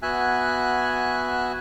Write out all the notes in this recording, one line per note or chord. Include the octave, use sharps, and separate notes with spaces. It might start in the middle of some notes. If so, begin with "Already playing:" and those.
B3 F#4 E5 G#5 F#6